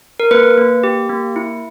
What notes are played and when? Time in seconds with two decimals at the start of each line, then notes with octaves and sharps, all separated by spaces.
0.20 A#4
0.31 A#3 B4
0.57 A#3
0.83 G4
1.09 A#3
1.36 E4